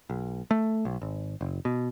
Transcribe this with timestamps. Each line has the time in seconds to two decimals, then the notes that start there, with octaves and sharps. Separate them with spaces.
0.10 B1
0.51 A3
0.85 B1
1.02 G#1
1.41 F#1
1.65 B2